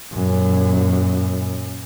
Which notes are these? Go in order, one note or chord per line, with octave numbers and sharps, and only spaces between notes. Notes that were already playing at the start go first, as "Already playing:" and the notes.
F#2 A#2